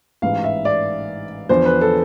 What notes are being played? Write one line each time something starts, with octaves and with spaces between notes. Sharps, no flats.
A1 G#2 E3 F5
E5
D5
E2 D3 F3 C5
B4
A4